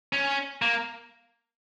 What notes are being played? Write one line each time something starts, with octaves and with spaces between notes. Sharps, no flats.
C#4
A#3